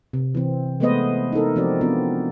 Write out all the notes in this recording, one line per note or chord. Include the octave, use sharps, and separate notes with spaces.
C3
E3 C4
G#3 A3 B3 B4 C5 D#5
D#4 E4 A4 A#4
F3 C4 F#4 D5
B3 C4 D4 F4